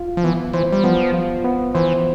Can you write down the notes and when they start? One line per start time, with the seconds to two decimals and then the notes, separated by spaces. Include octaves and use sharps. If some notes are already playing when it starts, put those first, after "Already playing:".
Already playing: F4
0.17 F3
0.24 E3 B3
0.54 E3 C5
0.72 G3
0.84 F3 B3
1.14 F4
1.44 B3
1.75 E3 C5